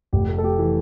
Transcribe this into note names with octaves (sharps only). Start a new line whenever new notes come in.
F1 G4
A3
A4
A3 G4
E3